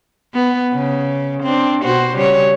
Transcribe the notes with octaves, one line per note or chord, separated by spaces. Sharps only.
B3
C#3
C4 D4
B2 F#4 C5
C#3 G3 C#5